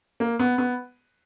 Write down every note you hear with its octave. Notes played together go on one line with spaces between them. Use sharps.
A#3
B3
B3